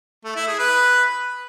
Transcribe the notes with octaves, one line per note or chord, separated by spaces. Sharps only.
A3
E4
G#4
B4